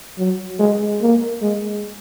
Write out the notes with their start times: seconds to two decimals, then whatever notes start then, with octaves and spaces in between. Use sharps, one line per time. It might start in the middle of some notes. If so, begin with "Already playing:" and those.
0.18 F#3
0.59 G#3
1.01 A#3
1.42 G#3